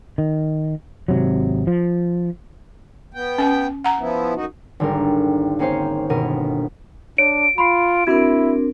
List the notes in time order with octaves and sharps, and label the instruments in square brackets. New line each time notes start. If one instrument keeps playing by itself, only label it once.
[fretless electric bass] D#3
G#1 C3 F#3
F3
[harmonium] B3 G5
[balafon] C#4 G#5
F#5 A#5
[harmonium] F3 B3 E4
F#2 D#4 F#4
[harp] G#1 D3 G3 D4 A#4
A#3 C4 C#4 C5 C#5 F5
G1 B2 D#3 A#4 D#7
[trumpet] D4 [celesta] C#5 [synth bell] D7
[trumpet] F4 [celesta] B5 C6 C7
[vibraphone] C4 D4 A#4 [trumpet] E4 [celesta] F#4 G#6